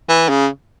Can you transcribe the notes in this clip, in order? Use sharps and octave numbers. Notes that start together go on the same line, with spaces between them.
E3
C#3